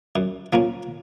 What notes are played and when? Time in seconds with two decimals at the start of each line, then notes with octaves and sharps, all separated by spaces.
0.16 F#2
0.53 F3 A#3 C#4